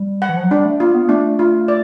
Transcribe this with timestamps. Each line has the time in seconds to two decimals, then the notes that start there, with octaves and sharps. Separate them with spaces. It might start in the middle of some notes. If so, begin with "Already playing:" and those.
Already playing: G3
0.22 F#5
0.29 E3
0.36 F3
0.43 F#3
0.51 G3 D4
0.65 A3
0.80 A#3 F4
0.94 B3
1.09 A3 D4
1.39 F4
1.68 D5